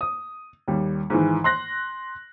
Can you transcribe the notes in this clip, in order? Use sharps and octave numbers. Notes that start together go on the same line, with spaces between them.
D#6
D#2 G3
G#2 D#3 E3
C6 F#6 A#6